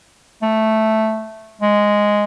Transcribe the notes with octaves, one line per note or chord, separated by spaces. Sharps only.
A3
G#3